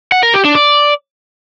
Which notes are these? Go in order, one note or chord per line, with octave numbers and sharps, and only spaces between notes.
F#5
A#4
G4
D4
D5